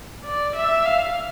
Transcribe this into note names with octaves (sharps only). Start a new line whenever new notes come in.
D5
E5
F5